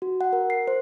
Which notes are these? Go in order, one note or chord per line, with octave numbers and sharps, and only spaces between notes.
F#4
F#5
A#4
C7
C5